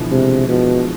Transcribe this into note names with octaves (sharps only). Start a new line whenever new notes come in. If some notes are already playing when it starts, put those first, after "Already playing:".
Already playing: B2 D3 E3 F3
C3 G#3
B2 F3